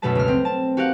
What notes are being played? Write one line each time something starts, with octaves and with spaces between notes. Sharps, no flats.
F#2 B2 A3 B3 B4 A5
C#2 F6
C4
A5
F#4 G4 A#4 F5 F#5